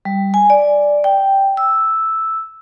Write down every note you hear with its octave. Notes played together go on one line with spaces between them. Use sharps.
G3
G#5
D5
G5
E6